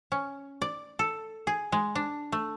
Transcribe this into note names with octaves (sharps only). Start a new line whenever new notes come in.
C#4
D5
A4
G#4
G#3
D4
A3